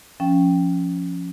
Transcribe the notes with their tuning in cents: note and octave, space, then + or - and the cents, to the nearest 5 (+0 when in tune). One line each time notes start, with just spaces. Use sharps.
F3 +0 C#4 +0 G5 +0